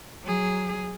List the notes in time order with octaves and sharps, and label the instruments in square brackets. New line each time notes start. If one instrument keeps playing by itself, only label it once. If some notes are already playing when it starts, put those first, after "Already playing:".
[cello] F#3 G#4